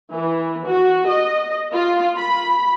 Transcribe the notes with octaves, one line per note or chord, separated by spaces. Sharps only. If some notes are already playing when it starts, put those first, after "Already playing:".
E3
F#4
D#5
F4
B5